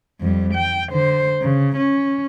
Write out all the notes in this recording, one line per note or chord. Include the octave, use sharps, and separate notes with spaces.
F2 G3
G5
D3 C5
C#3
C#4